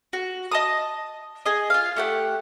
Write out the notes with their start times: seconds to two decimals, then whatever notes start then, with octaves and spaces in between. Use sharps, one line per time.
0.13 F#4
0.52 D#5 A5 D#6
1.46 G#4 D#5
1.70 F4 F5
1.96 A3 G4 F#5